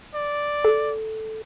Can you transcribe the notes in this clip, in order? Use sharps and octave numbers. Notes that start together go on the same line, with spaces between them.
D5
A4